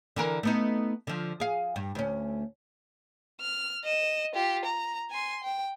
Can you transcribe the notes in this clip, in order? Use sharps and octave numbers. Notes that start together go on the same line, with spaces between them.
D3 E3 A#4
A3 B3 D#4
D3 F3
G#4 F5
G2
D2 C#4
F6
D#5 E7
F4 G4
A#5
G#5 C6
G5